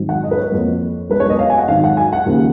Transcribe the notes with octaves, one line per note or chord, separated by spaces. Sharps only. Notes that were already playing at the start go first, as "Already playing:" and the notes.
Already playing: G#1 G#2 F#3
F#5
D#5
B4
C#5
F2 F3 A#3
B1 B2 G#3 B4
C#5
D#5
F5
G#5
F#5
G#1 G#2 D#3 F#3 F5
F#5
G#5
F#5
D#2 C#3 F3 A#3